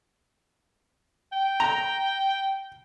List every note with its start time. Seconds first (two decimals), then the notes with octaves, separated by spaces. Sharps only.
1.32 G5
1.60 A#5